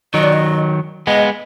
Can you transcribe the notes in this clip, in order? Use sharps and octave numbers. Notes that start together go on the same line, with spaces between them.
D#3 F#3 D#5
D5
D#5
G#3 B3 D#5